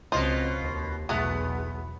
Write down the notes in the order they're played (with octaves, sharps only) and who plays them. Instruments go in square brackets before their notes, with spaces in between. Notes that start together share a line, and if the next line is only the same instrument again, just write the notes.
[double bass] C#2 C4 [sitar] B2 F4 [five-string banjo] F3 C5 D#5
[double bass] D#2
[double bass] B1 E2 [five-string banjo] A3 F#4 G#4 [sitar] B3